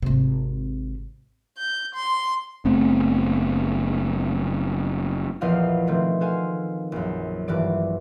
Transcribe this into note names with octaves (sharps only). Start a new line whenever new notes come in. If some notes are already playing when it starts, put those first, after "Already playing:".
G#1 C3
G6
C6
F#1 A3 B3 C4
A#1 E2 F3 D#5 F5
B2 D#3 A3 C4
F#4 A4 C5 F5 G#5
A#1 F#2
D#1 G2 E3 D5 D7